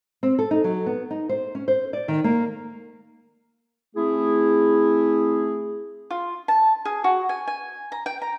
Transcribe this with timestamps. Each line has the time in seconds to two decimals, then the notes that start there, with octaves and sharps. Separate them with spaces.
0.23 C4
0.39 A4
0.51 D#4
0.64 F#3
0.86 B3
1.11 D#4
1.29 C5
1.55 C#4
1.68 C5
1.93 D5
2.08 D#3
2.24 A#3
3.96 A3 C4 E4 G#4
6.10 F4
6.48 A5
6.85 G#4
7.04 F#4
7.29 G#5
7.47 G#5
7.92 A#5
8.06 G5
8.22 A#5